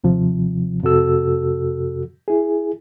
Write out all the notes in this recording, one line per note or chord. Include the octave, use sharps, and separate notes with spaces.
D#2 C3 F3
F2 C3 F#4 A4 E6
E4 G#4